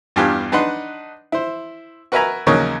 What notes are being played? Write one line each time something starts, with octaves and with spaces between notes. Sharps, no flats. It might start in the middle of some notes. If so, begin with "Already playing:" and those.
E2 G2 D4 F4 G4 G#5
D4 D#4 B4 F#5 C6
E4 C5
F#4 A#4 B4 E5 G#5 A#5
D#2 C#3 F#3 D#4 A#4 C#5